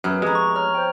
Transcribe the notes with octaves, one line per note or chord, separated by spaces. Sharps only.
F#2 B3 G#4
F2 G#3 E4 G4 A#5
C#6
C#5 A#5 F6
C5 G5